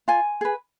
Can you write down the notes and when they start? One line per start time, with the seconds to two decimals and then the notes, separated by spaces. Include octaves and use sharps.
0.08 F4 G#5
0.41 G#4 B4